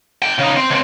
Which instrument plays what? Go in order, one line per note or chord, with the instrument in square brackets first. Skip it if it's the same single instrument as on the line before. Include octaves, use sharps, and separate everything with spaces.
[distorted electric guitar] D3 G5
C#3 D#4
C4
C#2 C4